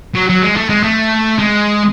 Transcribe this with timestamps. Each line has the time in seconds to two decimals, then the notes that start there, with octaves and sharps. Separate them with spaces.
0.15 F#3
0.29 F#3
0.42 G#3
0.56 A3
0.69 G#3
0.83 A3
1.39 G#3